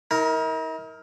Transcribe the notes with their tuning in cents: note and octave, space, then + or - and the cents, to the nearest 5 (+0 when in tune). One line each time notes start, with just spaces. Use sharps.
D#4 +45 A#4 +0